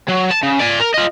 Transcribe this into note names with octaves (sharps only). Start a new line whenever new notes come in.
F#3
A5
C#3
D5 G#5
A#4
F4 D#5